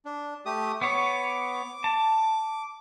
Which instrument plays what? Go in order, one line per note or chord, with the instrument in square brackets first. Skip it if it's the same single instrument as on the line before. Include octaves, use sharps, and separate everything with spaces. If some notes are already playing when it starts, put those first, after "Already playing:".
[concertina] D4
A3 G4 D#6
[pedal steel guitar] B3 C#5 [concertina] D6
[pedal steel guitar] A5